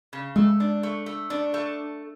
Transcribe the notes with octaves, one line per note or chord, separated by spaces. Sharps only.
C#3
G#3 A3
D4
A3
A3
D4
A3